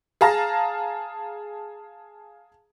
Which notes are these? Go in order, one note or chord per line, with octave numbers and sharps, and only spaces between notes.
G#4 F5 A5 A#5 A#6